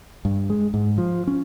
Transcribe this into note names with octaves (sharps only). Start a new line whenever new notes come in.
G2
G#3
G#2
F3
C#4